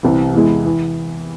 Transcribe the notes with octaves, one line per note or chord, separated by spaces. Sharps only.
C2 C3 E3
E2 E3 G#3 E4
E3